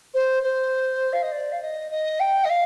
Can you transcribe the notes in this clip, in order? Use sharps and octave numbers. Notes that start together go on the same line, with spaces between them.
C5
C5
F5
D#5
D5
F5
D#5
D#5
G5
D#5
F5